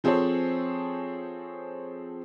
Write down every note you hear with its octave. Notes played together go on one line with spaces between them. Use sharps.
F3 C4 G#4 A4 C5 C#5